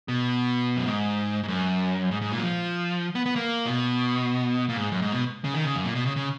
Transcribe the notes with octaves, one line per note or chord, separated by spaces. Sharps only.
B2
F#2
G#2
G#2
F#2
G#2
G#2
A#2
F#3
F3
B3
B3
A#3
B2
A#2
G#2
F#2
G#2
B2
C#3
D#3
C#3
F#2
A#2
B2
C#3
C#3